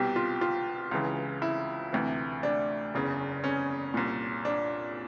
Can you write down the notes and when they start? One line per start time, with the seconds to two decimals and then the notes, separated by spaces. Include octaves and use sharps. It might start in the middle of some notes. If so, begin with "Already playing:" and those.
Already playing: C2 B2 G4
0.16 F4
0.41 F4
0.91 C#2 C#3 E3
1.42 E4
1.92 D2 C3 E3
2.43 D4
2.94 F#1 E2 C#3
3.44 C#4
3.94 C2 A#2
4.45 D4